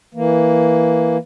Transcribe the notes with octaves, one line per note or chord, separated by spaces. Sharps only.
E3 A#3